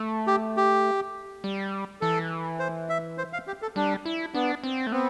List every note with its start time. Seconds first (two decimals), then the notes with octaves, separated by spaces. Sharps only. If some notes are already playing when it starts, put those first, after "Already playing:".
Already playing: A3
0.27 G4
0.57 G4
1.44 G3
2.01 E3 A4
2.59 C5
2.89 E5
3.18 C5
3.33 F5
3.47 G4
3.62 A4
3.76 G3 D4
4.05 E4
4.34 B3 D4
4.64 C4
4.87 A3
4.92 B3 C4